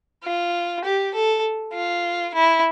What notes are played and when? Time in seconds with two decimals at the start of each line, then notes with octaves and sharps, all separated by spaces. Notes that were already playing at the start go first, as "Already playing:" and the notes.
0.24 F4
0.85 G4
1.14 A4
1.74 F4
2.34 E4